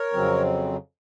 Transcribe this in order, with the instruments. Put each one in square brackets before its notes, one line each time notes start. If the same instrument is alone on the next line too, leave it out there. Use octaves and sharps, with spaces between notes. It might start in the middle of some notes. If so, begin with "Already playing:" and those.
Already playing: [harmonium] A#4 C#5
F2 C#3 F#3 C4